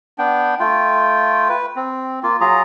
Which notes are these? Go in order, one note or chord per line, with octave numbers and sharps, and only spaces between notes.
B3 D4 G5
A3 F4 G5
B4
C4
A#3 F4
F#3 F4 G#4 A#5